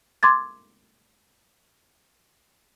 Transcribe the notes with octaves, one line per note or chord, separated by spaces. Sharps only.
C6 D6 G#6 A6